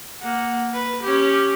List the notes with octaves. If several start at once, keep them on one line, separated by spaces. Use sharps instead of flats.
A#3 F#5
B4
C#4 G4